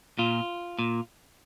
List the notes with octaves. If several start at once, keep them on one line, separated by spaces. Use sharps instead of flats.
A#2 F4
A#2